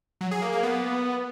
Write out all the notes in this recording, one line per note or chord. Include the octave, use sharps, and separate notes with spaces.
F#3
G#4
A#3
A#3
B3